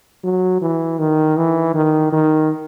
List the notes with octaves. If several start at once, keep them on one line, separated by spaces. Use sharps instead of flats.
F#3
E3
D#3
E3
D#3
D#3